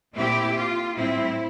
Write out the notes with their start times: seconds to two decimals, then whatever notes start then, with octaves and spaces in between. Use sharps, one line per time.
0.16 A#2 A3 C4 E4 G4
0.58 F4
0.98 A2 G3 C4 E4